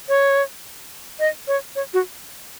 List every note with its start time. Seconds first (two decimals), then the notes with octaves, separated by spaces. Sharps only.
0.09 C#5
1.20 D#5
1.48 C#5
1.76 C#5
1.94 F#4